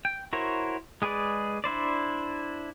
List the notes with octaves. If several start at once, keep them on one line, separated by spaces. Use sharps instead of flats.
G5
E4 F#4 A#4 C5 C#5
G#3 G#4 B4 D5
D4 E4 C5 D5